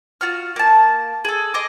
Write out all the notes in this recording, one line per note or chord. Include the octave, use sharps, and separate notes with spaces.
F4 F#4 F6
A#3 A5
G#4 A4
D#5 C6 D6